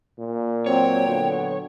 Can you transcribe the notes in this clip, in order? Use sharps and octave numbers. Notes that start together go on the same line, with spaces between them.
A#2
F#3 C4 C#5 G5
D3 F#3 B3